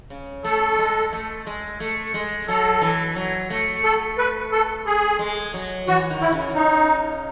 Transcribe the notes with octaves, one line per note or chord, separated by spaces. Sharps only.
C#3
A3 A4
G#3
A3
G#3
A3
G#3
F#3 A4
E3
F#3
A3
A4
B4
A4
G#4
G#3
F#3
E3 F#4
D#3
E4
C#3
D#4